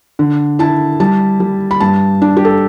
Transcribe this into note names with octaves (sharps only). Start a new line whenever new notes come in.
D3
E4 A5
G3 A5
G3
B5
G2 A5
D4
G4
A4